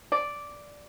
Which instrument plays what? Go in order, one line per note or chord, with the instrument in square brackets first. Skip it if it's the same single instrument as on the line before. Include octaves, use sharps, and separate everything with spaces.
[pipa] D5